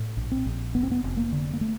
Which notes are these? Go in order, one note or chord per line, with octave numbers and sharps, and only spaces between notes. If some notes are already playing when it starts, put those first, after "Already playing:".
Already playing: A2
A#1
C4
A#1
F1 B3
C4
B3
F1
A#3
D3
A#3
A3